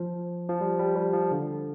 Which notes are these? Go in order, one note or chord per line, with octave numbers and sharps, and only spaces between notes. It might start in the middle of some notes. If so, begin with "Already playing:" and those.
Already playing: F3
F3
G3
G3
G3
F3
D3